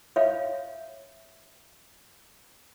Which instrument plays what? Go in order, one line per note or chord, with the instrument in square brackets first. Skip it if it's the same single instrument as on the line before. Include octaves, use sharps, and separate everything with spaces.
[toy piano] C#5 E5 F5